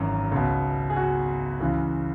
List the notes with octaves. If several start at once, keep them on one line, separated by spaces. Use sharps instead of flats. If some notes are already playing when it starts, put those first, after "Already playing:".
Already playing: G#1 F#2 E3
C#2 B2
G#4
F#4
C#2 C#3 E3